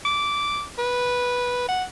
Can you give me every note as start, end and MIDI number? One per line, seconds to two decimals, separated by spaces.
0.05 0.63 86
0.78 1.67 71
1.69 1.84 78